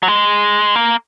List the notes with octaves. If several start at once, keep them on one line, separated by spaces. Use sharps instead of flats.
F#3
G#3
A#3